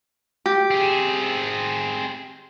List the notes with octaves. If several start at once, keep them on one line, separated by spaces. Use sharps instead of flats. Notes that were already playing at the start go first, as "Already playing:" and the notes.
G4
C4 G#4